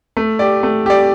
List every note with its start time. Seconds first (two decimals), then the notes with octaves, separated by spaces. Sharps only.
0.17 A3
0.39 G4 D5
0.63 A3
0.86 G4 D5